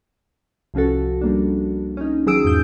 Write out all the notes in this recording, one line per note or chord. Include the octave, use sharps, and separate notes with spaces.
C2 F3 C#4 F#4 A4
G3 A#3 D4
C#4 D#4
D#3 F#3 G#4 D#6 E6 D7
E2 G#2 F3 G6